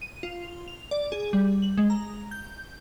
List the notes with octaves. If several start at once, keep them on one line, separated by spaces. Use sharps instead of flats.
D#7
F4
F7
D5
G#4
G3
F#7
G#3
A#5
G6